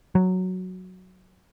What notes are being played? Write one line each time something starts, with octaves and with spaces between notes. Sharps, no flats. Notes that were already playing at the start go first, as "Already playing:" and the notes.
F#3